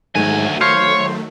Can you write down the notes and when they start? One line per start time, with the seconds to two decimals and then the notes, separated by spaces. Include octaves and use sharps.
0.16 D2 G#2 D#3 F#3 A3 G#5
0.61 C5 C#5 F5 C#6